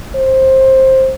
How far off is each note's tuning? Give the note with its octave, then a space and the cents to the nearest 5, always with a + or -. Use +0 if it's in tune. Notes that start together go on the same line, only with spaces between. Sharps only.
C5 +15